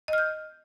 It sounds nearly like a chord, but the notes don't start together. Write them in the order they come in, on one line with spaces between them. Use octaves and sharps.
D#5 F6 G6